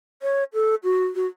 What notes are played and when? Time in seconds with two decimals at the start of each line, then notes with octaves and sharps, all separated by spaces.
0.22 C#5
0.54 A4
0.84 F#4
1.15 F#4